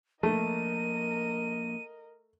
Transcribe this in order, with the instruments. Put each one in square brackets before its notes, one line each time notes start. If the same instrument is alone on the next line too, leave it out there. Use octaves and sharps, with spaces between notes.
[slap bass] F3 A#3 [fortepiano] A3 [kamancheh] A#4 D#5 [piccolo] D#7